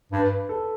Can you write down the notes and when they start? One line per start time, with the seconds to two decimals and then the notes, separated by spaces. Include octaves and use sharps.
0.12 G2 B4
0.49 A4